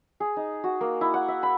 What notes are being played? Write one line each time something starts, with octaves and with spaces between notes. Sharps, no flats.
G#4
D#4
F#4
A#3
E4
F#5
E5
B5